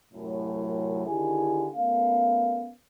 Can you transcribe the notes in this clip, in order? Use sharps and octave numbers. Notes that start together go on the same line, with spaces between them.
C2 F#2 A2
D3 D#3 E4 G4 G#4 G#5
A3 B3 C#4 A#4 F5